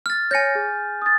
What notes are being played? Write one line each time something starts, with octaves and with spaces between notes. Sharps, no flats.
F6 A6
C#5 G#5 G6 A#6 C#7
G#4
D#6 A6